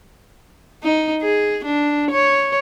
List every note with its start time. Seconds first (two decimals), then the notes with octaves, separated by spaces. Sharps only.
0.83 D#4
1.22 G#4
1.65 D4
2.11 C#5